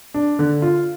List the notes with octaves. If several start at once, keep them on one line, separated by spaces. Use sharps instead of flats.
D4
D3
F4